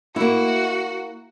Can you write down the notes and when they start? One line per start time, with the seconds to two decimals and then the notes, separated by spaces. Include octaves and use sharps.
0.16 A#3 E4 F#4